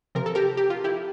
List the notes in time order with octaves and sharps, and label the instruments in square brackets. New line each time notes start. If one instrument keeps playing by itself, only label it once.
[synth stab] C3 F3 C4 A#4
A4
G4 A#4
G4
F4
E4 G4